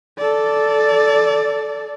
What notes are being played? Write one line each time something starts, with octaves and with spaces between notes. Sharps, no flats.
A4 D5